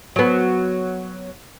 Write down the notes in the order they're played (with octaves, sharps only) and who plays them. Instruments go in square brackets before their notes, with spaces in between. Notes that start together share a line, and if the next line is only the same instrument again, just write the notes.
[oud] F#3 B3